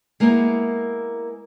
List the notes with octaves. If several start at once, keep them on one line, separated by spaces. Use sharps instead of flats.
G#3 A#3 B3 E4 A#4